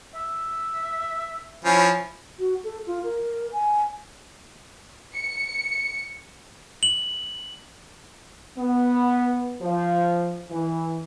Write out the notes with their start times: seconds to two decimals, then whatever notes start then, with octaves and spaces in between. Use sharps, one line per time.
0.15 E5
1.65 F3 C#4 E4
2.39 F#4
2.64 A4
2.87 F4
3.03 A#4
3.52 G#5
5.15 C#7
6.83 F#7
8.58 B3
9.60 F3
10.50 E3